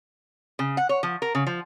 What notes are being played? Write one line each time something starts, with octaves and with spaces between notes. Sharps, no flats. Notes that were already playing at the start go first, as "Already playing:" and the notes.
C#3
F#5
C#5
F3
A#4
C#3
F3